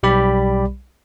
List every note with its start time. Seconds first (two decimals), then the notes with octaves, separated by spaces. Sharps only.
0.03 B1 G3 G4 D5 B5